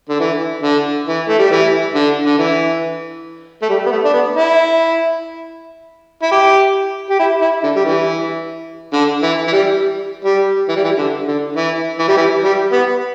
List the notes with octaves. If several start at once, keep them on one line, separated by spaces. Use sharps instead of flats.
D3
E3
D3
E3
A3
G3
E3
D3
D3
E3
A3
G3
B3
A3
D4
B3
E4
E4
G4
G4
E4
E4
D3
G3
E3
D3
E3
E3
G3
G3
E3
G3
E3
D3
D3
E3
E3
G3
E3
G3
B3